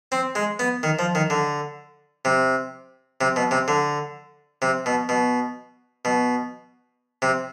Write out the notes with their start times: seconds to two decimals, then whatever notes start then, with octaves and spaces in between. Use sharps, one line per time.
0.12 C4
0.35 G#3
0.59 B3
0.83 D#3
0.99 F3
1.15 D#3
1.30 D3
2.25 C3
3.21 C3
3.36 B2
3.51 C3
3.68 D3
4.62 C3
4.86 B2
5.09 B2
6.05 B2
7.22 C3